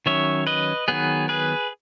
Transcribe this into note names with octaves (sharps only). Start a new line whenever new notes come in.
D#3 F#3 C#4 C#5 E5
B4 D#5
D#3 F#3 B3 G#4 B4
G#4 B4